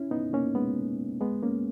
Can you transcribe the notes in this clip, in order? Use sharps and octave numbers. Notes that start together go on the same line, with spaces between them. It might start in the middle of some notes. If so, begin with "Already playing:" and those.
Already playing: C#4 E4
B3 D#4
A#3 C#4
G#3 B3
G#3 B3
A#3 C#4